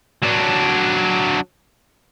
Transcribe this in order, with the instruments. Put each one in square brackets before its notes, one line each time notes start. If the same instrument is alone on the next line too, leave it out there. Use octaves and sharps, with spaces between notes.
[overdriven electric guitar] F#3 D4